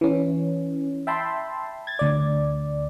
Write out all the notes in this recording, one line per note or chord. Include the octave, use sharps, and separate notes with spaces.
E3 C#4
E5 G5 A5 B5 C6
G#6 A6
D2 D5